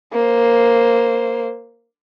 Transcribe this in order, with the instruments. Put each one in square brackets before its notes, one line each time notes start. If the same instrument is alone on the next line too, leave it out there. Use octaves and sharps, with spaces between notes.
[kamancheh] A#3 C5